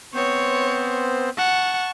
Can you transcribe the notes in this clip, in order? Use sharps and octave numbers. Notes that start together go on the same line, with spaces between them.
B3 C4 C5 C#5
F#5 A5 C#6